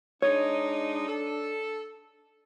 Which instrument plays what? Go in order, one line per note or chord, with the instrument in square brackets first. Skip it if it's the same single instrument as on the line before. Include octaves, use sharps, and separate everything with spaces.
[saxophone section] G#3 D#4 [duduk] D4 [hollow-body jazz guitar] C#5
[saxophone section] A4